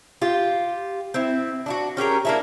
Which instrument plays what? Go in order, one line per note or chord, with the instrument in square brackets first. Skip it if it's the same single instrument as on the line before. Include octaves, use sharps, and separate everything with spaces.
[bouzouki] F4 G4
C4 E4
D4 E4 F#4
C#4 G4 G#4 A#4
A#3 D4 E4